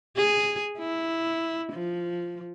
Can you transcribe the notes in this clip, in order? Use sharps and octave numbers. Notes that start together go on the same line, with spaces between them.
G#4
E4
F3